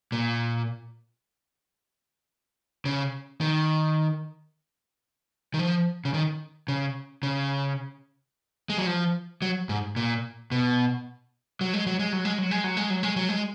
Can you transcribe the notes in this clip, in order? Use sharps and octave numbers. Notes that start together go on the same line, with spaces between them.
A#2
C#3
D#3
D#3
F3
C#3
D#3
C#3
C#3
G#3
F#3
F3
F#3
G#2
A#2
B2
F#3
G#3
F#3
G#3
F#3
G#3
F#3
G#3
F#3
G#3
F#3
G#3
F#3
G#3